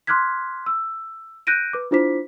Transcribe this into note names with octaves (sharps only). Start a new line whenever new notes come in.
C6 D6 F6 F#6 G#6 B6
E6
F#6 G6 A#6 D7 D#7
B4 D6
D4 E4 F4 C5 D6 B6